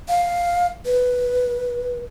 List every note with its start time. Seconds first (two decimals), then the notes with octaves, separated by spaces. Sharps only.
0.09 F5
0.86 B4